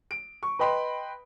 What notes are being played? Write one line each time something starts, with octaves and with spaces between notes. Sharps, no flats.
D7
C#6
B4 D#5 G5 B5 C6